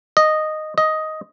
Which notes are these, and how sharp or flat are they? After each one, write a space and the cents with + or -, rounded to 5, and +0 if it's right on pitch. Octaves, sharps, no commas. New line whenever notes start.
D#5 -5
D#5 +10